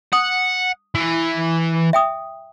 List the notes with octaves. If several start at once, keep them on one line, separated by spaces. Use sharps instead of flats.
F#5 D#6
E3
E5 G5 D#6